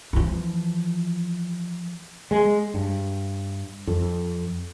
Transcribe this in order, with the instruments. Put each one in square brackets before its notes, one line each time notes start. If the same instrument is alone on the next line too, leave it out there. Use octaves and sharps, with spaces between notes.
[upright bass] E3 F3
[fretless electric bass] G#3
G2
F2